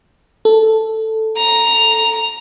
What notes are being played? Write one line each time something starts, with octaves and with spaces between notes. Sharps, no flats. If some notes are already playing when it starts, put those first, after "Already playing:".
A4
A#5